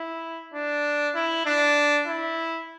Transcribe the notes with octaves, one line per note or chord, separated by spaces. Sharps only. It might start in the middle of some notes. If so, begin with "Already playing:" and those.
Already playing: E4
D4
E4
D4
E4